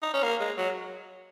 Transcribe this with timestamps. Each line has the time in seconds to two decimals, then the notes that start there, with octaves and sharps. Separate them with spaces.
0.02 D#4
0.14 C#4
0.23 A#3
0.40 G#3
0.58 F#3